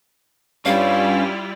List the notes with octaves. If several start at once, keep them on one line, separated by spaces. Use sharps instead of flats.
G2 G3 C#4 E4 F4 F5